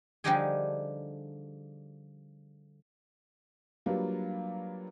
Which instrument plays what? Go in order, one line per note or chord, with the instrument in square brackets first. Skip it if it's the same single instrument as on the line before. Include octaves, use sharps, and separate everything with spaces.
[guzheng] D3 F3 G3 D#4 G4 G#4
[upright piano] F#3 G3 A#3 D4 F4 B4